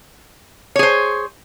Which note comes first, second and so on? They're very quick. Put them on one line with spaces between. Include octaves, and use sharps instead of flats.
C#5 G#4 C5